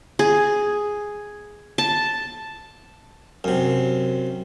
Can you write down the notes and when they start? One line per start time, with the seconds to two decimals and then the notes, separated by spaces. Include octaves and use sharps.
0.19 G#4
1.78 A5
3.44 F#2 C3